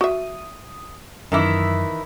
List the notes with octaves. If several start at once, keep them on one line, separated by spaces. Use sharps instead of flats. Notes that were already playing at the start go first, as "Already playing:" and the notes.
F#4 E5 D#6
F#2 D#3 E3 E4